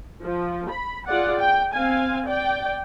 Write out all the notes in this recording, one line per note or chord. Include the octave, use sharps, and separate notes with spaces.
F3
B5
F4 G#4 D5 F#5
G5
C4 F5 G#5
D5 G5